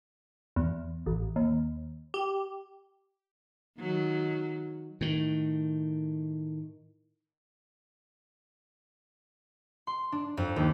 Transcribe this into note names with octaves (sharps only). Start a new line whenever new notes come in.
E2
A1
D#2
G4
D#3 F#3
A2 D#3
C6
D4
F2
D#2